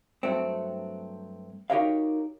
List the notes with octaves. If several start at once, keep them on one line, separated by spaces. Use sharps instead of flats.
G2 F#3 A3 C4
D#4 F#4 G4 A#4 C#5 F5